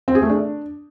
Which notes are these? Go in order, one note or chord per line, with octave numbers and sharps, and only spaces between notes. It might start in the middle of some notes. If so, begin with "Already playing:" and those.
C4
G#4
A3
D4